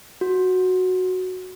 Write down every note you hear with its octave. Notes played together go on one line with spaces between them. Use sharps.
F#4